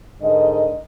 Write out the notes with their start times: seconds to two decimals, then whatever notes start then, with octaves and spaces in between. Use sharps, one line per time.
0.22 G#2 D3 A#4 D#5